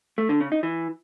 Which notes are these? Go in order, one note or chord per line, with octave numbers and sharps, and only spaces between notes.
A3
D3
C#3
D#4
E3